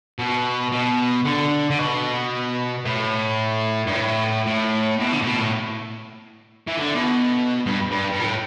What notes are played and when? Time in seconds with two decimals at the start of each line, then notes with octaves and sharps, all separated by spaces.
0.19 B2
0.72 B2
1.25 D3
1.70 D3
1.79 B2
2.85 A2
3.87 G2
3.92 A2
4.46 A2
4.99 B2
5.13 D3
5.22 A2
5.26 B2
5.39 A2
6.68 E3
6.78 D3
6.95 B2
7.66 G2
7.91 G2
8.12 G2
8.20 A2